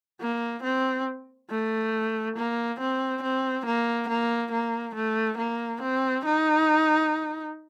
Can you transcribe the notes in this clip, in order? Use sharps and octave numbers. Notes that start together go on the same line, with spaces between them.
A#3
C4
A3
A#3
C4
C4
A#3
A#3
A#3
A3
A#3
C4
D#4